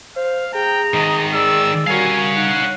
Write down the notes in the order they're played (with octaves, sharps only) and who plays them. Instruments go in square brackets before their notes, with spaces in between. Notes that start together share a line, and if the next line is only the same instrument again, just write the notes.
[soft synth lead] C5 [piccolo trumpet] F5
[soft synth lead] G#4 [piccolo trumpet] G5 [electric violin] A#5
[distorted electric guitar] G#2 D#3 [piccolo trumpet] D#5
[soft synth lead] G#4 [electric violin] D5 [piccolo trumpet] E6
[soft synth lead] G3 [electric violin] F#4 A#4 [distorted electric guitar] C#5 F5 [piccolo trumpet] G#5
[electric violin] D#4 [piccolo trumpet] F#5